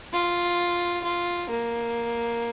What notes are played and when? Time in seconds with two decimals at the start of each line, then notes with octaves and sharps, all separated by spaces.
0.13 F4
1.04 F4
1.50 A#3